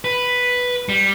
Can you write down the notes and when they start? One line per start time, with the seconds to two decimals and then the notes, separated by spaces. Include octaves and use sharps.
0.05 B4
0.89 G3